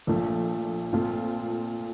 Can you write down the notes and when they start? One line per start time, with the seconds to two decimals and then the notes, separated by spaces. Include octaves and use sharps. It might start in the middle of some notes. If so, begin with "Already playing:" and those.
0.07 A#1 A#2 A3
0.93 A#2 A3 C4 F4